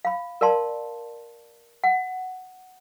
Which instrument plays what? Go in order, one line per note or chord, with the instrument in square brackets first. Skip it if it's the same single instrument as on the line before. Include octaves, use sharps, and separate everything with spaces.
[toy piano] F5 B5
A#4 D5 F5 A5 C6
F#5